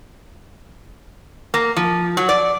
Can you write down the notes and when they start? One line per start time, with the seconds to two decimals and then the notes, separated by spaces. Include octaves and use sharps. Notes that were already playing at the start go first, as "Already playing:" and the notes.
1.54 A#3
1.77 F3
2.17 F#3
2.29 D5